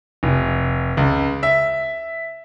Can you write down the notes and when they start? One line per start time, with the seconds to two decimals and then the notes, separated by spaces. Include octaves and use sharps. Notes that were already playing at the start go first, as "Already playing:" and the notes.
0.23 F1
0.97 C#2
1.43 E5